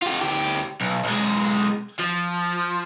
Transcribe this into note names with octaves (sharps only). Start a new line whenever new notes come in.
F4 G4
D2 G4
B1
B1 G#3
F3